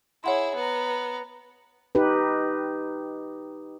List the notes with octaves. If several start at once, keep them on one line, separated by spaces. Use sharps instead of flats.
E4 G#4 C#5 F#5 C6
B3 A#5
D#4 G4 B4